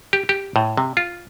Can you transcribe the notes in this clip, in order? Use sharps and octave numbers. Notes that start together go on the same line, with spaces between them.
G4
G4
A2
C3
F4